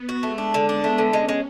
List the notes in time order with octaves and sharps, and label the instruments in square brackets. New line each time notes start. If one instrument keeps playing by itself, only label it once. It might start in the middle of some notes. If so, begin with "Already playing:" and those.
Already playing: [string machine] B3
[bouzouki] F#4
[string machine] G#3 [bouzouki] A3
[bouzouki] D4
D3
[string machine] B3 [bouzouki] D4
[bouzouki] A3
D3
[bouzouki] G#3 [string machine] C#4
[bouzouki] G#3